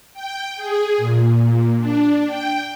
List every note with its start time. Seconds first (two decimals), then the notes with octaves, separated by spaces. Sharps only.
0.13 G5
0.56 G#4
0.98 A#2
1.78 D4
2.26 G5